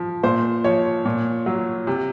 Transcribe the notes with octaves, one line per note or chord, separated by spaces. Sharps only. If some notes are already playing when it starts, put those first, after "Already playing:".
Already playing: F3
A#2 C5
F3 C#5
A#2
F#3
C3